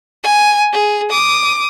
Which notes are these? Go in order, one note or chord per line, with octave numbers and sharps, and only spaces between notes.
G#5
G#4
D6 D#6